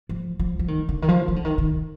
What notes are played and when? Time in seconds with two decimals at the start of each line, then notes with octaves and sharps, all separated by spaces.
0.09 F3
0.39 F3
0.59 F3
0.68 D#3
0.89 D3
1.02 D#3
1.09 F3
1.28 D#3
1.36 D3
1.45 D#3
1.58 D#3